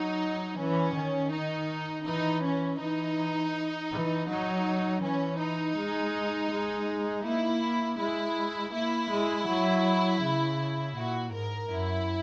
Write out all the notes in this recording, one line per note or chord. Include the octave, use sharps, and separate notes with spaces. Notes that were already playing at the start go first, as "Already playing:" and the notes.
Already playing: F#3 D#4
E3 C#4
D#3
D#4
E3 D#4
C#4
E3 D#4
E3
F#3 D#4
E3 C#4
D#4
G#3
G#3
A#3 E4
G#3 E4
A#3 E4
G#3
F#3
C#3
A#2 F#4
G#2 A#4
F#2 E4